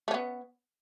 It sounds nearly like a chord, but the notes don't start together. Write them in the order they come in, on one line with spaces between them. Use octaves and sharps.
A3 C#4 B3